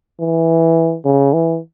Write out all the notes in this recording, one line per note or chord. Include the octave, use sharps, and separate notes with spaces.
E3
C#3
E3